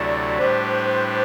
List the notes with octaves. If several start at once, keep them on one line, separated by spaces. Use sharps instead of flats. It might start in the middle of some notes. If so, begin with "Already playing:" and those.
Already playing: D2 C3 F#3 A3 E4 D5
A2 G3 D4 G4 B4 C5